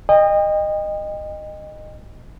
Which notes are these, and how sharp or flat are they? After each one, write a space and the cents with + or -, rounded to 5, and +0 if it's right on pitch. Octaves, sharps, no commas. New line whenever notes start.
D#5 -15 G5 +35